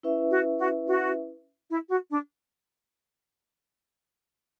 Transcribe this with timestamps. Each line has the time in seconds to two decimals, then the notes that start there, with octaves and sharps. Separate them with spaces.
0.03 C#4 E4 B4 E5
0.31 F#4
0.59 F#4
0.87 F#4
1.70 E4
1.90 F#4
2.11 D4